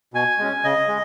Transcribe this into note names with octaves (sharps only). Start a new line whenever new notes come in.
B2 G#5
G#3 C#4
C#3 D#5
G#3